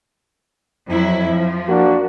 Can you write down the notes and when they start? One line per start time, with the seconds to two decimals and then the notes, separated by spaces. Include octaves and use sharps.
0.88 F2 F#3 E4
1.31 F3
1.68 A#3 D4 F#4